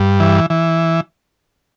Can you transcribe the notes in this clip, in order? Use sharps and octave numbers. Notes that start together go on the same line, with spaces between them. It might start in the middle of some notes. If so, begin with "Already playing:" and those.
Already playing: G2
E3
E3